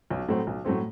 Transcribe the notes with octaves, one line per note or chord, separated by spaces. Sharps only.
B1
A2 F#3 A3 C4
B1
A2 F#3 A3 C4